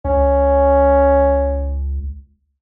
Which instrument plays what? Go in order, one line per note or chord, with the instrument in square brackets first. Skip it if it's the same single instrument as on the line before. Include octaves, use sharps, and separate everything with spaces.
[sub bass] C#2 [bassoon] C#4